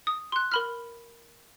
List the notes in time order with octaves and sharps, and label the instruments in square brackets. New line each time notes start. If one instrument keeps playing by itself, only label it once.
[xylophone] D#6
C6 F#6
A#4 B5 F6